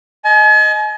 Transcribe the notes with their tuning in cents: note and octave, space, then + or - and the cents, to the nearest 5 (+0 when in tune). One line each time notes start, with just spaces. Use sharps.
D#5 +0 G#5 +45